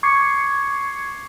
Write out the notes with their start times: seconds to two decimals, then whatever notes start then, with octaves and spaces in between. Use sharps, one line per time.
0.03 C#6 D6 G#6 C7 C#7